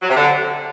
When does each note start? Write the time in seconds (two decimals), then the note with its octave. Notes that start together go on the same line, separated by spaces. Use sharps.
0.02 F#3
0.09 C3
0.15 D3